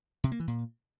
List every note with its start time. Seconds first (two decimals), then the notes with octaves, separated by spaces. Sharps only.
0.24 C3
0.32 A#3
0.40 E3
0.48 A#2